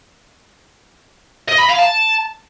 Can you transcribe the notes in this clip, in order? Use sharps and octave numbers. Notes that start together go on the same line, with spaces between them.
D#5
B5
F5
A5